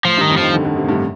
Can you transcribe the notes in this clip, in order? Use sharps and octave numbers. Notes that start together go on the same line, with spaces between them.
A2 F3
G2 D#3
F2
D#3 F3
D3
D3
C3
A2
G2